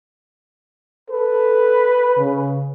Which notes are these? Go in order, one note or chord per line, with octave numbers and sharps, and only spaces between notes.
A4 B4
C#3